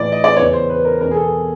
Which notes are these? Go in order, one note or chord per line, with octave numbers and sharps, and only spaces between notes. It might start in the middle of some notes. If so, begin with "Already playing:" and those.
Already playing: A2 E3 D5
D#5
D5
E2 C#3 E3 C#5
C5
B4
A#4
E2 B2 A#4
G#4
A4